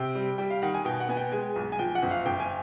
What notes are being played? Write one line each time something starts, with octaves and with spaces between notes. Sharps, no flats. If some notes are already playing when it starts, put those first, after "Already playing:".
Already playing: C3 G5
G3
G3 G5
F5
D#3 F#5
G#5
B2 G5
F#5
B3 G#5
G5
G#3 G#5
B1
G#5
F3 G5
F#5
F#1
F5
F#1 G5
G#5